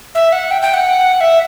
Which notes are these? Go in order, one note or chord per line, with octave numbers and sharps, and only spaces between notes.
E5
F#5
G5
G5
F#5
E5